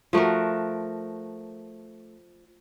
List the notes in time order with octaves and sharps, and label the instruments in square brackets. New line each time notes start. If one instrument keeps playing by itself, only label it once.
[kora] F3 A3 F#4 A#4